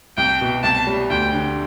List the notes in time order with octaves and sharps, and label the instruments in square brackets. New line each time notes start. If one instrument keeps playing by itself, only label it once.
[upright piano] C2 [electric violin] G5
[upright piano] B2
[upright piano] C2 [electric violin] A5
[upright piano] G3
[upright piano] D2 [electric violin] G5
[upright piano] D3